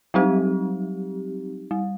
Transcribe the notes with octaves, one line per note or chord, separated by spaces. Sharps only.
F#3 G3 C4 D#4 G4
G3